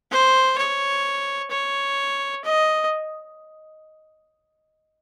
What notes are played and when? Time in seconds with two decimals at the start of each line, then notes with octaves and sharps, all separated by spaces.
0.11 C5
0.58 C#5
1.51 C#5
2.44 D#5